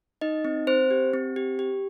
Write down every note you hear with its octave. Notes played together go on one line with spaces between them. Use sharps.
D#4 D#5
C4
C4 C5
G4
C4
G4
G4